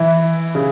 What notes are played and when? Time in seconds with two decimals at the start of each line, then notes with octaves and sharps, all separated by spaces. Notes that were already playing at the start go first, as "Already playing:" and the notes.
Already playing: E3 E4
0.55 C#3